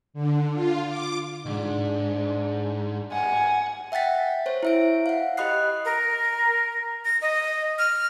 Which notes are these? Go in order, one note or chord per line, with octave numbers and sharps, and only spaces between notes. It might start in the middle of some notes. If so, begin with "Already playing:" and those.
D3
F4
D6
C#2 G#2 D4
F#5 G#5
E5 F#5 G5 A6 B6
C5 C#5
E4 E5 D7
F5 F#5
G4 D#5 B5 D#6 F#6 C7
A#4
A#6
D#5
F6